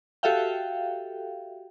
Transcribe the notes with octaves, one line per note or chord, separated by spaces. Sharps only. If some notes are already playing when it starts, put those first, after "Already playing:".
F#4 G4 A4 E5 F5 G5